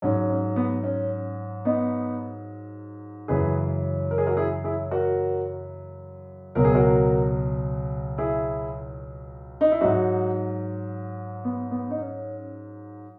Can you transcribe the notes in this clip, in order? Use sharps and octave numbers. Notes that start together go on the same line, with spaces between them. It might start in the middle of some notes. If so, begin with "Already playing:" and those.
G#2 F#3 C#4
C#4
B3
C#4
B3 D#4
F#2 C#3 E3 G#4 B4
A#4
G#4
F#4 A#4
E4 G#4
E4 G#4
F#4 A#4
C#2 B2 F#3 A#4
G#4
F#4 A#4
E4 G#4
D#4
E4
G#2 F#3 D#4 F#4
B3
B3
D#4
C#4